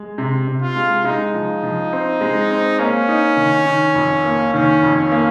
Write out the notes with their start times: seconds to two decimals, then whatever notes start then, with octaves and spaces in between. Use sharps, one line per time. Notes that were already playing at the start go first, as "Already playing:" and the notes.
Already playing: G#3
0.18 C3
0.48 C3
0.62 F4
0.76 G#3
1.04 G#3 D#4
1.34 F3
1.63 F3
1.93 C4
2.21 G#3
2.50 C4
2.79 A#3 C#4
3.08 D#4
3.37 D#3
3.66 D#3
3.95 F2
4.25 A#3
4.54 D#3 C#4
4.83 F2
4.97 C#4
5.11 A#3